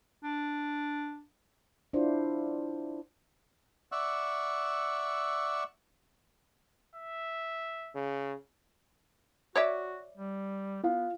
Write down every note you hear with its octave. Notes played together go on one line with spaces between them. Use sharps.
D4
D4 E4 F4 C5
D5 E5 F#5 C#6 E6
E5
C#3
F#4 C#5 D5 E5
G3
B3 F4 F5